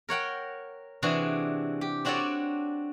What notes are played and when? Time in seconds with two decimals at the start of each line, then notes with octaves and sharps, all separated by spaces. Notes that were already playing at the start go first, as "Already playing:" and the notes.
0.09 A#4 C#5 F#5 G5
1.02 C3 E3 D4 F#4 G#4
1.81 G4
2.05 C4 D4 F#4 A4 C#5 D5